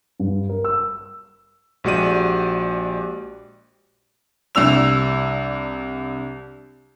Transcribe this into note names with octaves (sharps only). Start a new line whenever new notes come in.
G2
A#4
E6
A#1 G#3 F#4 G4 D5 D#7
C2 D4 E6 F7